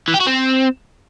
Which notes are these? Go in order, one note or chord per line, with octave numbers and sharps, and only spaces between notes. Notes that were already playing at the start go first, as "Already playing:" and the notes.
E3
G4
F#4
C4